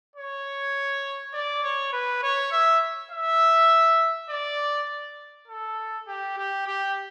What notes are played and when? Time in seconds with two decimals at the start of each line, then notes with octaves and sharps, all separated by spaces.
0.16 C#5
1.34 D5
1.63 C#5
1.93 B4
2.22 C#5
2.52 E5
3.11 E5
4.30 D5
5.48 A4
6.07 G4
6.37 G4
6.66 G4